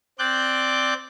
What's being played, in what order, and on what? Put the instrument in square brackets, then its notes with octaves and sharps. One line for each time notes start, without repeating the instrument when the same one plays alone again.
[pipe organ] C4 D5 D6 F#6 G6